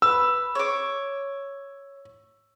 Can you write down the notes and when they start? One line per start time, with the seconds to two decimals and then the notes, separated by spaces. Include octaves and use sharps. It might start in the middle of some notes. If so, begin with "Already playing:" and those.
0.02 B4 E6
0.55 C#5 D6